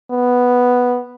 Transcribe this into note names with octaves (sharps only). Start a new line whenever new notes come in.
B3